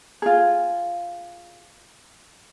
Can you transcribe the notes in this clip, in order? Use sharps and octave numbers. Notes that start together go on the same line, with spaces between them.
F4 G#4